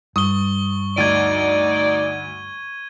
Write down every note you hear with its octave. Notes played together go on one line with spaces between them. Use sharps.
G2 C#6 D#6 G7
D2 D#4 D5 G#6 D#7